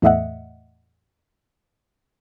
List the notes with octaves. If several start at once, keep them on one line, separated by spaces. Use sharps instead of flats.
E2 A2 A3 D#5 E5 F#5